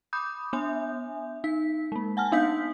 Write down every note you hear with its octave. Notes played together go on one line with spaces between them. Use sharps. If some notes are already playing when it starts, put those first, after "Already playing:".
B5 D6 D#6 G6
B3 D4 E5 G#5 G6
D#4 B6
G#3 A#3
F#5 G#5 A5 F6
B3 D4 D#4 F5 G6 B6